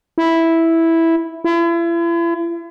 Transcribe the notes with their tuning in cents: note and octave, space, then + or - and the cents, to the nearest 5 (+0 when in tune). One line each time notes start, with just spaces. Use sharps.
E4 -5
E4 +40